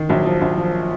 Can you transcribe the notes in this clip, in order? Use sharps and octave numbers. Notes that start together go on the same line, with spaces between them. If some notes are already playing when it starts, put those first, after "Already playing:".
Already playing: D#3
A#1 F#3
F3
A#1
F3